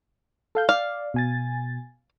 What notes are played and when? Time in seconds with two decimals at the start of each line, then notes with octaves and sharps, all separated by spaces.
0.55 A4 F5 G6
0.69 D5 F5
1.14 B2 G#5 A6